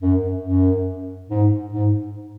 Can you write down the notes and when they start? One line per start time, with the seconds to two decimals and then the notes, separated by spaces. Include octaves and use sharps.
0.01 F#2
0.44 F#2
1.29 G#2
1.73 G#2